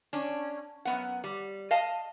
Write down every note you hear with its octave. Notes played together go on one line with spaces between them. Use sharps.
C#4 D4
F#2 B3 F#5
G3
D#5 F5 A5